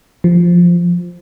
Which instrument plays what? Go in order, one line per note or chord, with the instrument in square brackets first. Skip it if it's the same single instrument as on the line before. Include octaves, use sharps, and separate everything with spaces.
[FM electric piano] F3